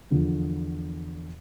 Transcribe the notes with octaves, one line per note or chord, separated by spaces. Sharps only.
E2 D3 F3